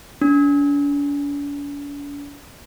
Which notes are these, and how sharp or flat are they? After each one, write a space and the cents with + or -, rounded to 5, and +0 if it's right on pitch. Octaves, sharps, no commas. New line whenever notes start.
D4 -45